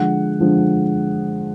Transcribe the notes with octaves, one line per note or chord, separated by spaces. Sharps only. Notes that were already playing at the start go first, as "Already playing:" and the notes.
Already playing: D3 F3 G#3 F#5
D3 F3 G#3